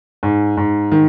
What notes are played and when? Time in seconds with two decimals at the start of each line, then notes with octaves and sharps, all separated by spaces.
0.23 G#2
0.57 G#2
0.92 D#3